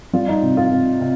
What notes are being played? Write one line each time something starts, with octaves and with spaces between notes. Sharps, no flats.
G3 F4
D#4
C3
F4
C3
C3